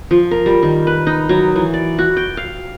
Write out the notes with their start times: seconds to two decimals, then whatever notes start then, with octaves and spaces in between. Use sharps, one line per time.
0.11 F3
0.31 A#4
0.46 G3
0.63 D#3
0.87 B4
1.07 D#4
1.29 F#3
1.56 E3
1.74 D5
1.98 F#4
2.17 G5
2.37 F5